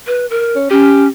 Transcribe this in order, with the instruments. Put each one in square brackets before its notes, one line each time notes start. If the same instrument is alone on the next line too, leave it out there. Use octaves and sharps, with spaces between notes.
[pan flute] B4
A#4
[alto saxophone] C#4
[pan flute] C#4 [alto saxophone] G4